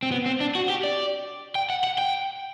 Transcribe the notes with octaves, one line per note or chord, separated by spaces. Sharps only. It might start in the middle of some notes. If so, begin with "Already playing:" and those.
C4
B3
C4
D4
F#4
G4
D5
G5
F#5
F#5
G5